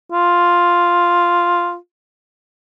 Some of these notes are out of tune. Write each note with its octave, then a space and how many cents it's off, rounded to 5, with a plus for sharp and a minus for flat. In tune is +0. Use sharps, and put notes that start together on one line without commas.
F4 +0